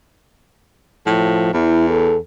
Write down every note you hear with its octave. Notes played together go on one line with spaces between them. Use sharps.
A2 F3
E2 E4
A4